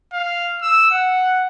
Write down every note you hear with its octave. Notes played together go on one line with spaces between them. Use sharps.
F5
E6
F#5